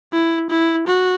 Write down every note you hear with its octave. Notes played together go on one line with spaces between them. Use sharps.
E4
E4
F#4